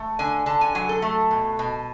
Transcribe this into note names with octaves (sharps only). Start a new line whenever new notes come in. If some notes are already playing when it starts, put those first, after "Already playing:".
Already playing: A3
D3 G#5
D3 A5
G#5
F#3 G#5
A4
A3
B2
B2